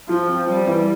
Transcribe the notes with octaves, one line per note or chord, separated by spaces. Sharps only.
F3 F4
C4
G3 C4
E3